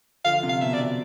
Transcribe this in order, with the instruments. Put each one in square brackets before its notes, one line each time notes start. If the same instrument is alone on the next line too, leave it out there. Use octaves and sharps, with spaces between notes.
[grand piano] D3 F3 [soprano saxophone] F5
[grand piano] C3
[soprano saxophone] F5
[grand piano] B2 [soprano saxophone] E5
[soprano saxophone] D5
[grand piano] C3